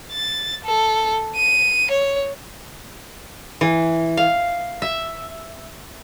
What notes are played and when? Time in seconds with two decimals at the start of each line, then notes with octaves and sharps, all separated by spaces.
0.12 A6
0.65 A4
1.37 D#7
1.91 C#5
3.61 E3
4.17 F5
4.82 E5